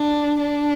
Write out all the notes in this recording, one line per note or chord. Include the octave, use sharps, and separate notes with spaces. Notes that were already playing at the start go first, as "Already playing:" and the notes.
Already playing: D4
D4